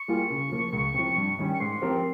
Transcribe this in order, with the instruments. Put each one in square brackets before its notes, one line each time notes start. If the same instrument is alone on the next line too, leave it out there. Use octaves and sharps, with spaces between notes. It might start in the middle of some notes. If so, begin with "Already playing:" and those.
Already playing: [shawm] C#6
[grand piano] G3 A#3 F4 G#4
C#3
F3 A#3
C#2
C3 F3
G2
D#3 G3 C#4
[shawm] C#6
[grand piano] G#2 [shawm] C6
[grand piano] F3 C4 G4 A#4